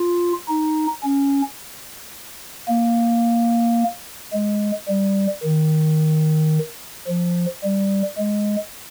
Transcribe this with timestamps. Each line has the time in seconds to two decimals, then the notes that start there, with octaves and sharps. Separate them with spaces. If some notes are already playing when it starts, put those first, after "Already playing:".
Already playing: F4
0.48 D#4
1.03 C#4
2.68 A#3
4.33 G#3
4.88 G3
5.43 D#3
7.07 F3
7.63 G3
8.18 G#3